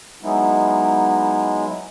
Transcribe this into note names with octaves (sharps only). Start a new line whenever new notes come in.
F#3 G#3 B3 D#4 E4